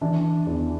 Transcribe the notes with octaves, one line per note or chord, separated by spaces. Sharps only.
E3 D4
E2